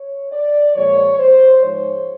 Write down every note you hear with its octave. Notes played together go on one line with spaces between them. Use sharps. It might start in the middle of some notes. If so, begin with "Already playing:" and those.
Already playing: C#5
D5
A#2 F3 G#3 C#5
C5
G#2 F3 G#3 C#5